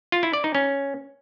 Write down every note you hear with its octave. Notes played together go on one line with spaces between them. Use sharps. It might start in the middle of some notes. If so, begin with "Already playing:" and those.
F4
E4
D5
D#4
C#4